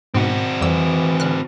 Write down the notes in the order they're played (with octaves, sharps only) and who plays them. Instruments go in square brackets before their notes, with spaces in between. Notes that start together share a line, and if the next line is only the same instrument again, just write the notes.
[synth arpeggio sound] G#2 B2 [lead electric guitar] C4 F#4
[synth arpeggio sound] F2 G3 E6 [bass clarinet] E3
[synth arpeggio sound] D3 F6 F#6